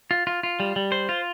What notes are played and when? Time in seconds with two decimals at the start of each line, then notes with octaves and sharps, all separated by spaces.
0.11 F4
0.27 F4
0.43 F4
0.60 G3
0.76 G3
0.92 C5
1.09 F4